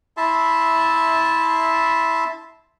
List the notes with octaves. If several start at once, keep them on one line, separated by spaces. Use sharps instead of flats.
E4 E5 A5 C6